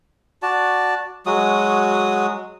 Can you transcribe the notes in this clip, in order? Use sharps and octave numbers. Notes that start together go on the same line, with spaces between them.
F#4 D5 A5
F#3 G#3 F#4 D#6